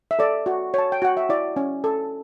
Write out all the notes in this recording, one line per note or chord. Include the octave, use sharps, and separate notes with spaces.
E5
A4 D5
F#4
C#5 A5
G5
F#4 F#5
E5
E4 D5
C#4
A4